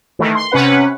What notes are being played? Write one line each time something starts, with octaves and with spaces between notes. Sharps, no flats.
D#3 E3 A3
C6
C3 C#4 B4 F#5